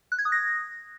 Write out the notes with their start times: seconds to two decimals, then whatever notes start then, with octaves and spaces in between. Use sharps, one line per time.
0.12 F#6
0.18 G#6
0.25 D#6
0.32 A#6